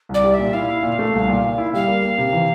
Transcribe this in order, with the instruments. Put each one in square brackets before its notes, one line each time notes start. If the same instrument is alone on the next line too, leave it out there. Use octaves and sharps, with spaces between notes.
[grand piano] C2 [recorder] D5
[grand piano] G3
[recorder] E5
[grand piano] A#2
[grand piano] E4 [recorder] F5
[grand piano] E4
A#2
A3
C2
A#2
A#2
E4
[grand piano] G3 [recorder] F5
[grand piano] A#3
A#3
C3
E3